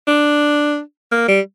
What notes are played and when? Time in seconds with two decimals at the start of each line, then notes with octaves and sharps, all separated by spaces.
0.07 D4
1.12 A#3
1.28 G3